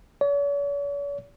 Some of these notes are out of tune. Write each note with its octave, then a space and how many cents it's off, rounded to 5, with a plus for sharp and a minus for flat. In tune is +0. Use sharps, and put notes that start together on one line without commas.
C#5 +45